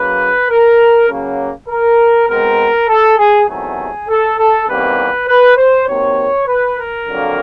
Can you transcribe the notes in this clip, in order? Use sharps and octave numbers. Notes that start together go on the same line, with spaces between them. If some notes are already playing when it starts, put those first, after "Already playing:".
Already playing: C#3 F#3 A#3 B4
A#4
C#3 F#3 A#3
A#4
B2 G#3 C4 A#4
A4
G#4
E2 C3 D#3 F#3 A3 G#4
A4
A4
E2 C3 D#3 G3 A#3 B4
B4
C5
C3 D#3 F#3 A#3 C#5
B4
A#4
F2 D3 F#3 A#3